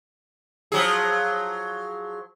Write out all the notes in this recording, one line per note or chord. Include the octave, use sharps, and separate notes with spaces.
F3 F#3 G#4